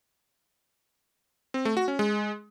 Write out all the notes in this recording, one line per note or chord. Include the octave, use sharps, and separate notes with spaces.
C4
A3
F#4
C#4
G#3